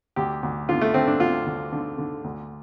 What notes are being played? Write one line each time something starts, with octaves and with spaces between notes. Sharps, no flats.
D2 G4
D2
D3 F4
A3
D3 C4
D4
D2 F4
D2
D3
D3
D2